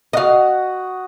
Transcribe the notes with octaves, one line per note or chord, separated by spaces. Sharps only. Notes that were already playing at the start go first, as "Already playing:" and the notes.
F#4 D#5 F5 F#5 D#6